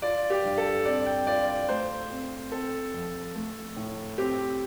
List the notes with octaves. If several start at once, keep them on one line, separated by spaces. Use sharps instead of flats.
F4 D5
G4
G2
A4
C4 D5
G5
F4 D5
D5
A3 C5
C4
C4 A4
F2
A3
A2
C4 G4